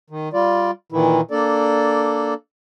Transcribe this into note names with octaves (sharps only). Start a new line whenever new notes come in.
D#3
G3 F4 D5
A#2 D#3 E3 E4
A#3 D4 A4 D5